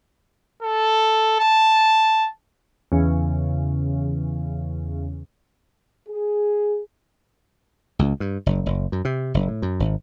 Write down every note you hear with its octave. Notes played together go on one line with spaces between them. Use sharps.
A4
A5
E2 C#3
G#4
C#2
G2
F#1
F#1
F#2
C3
F#1
A2
F#2
G#1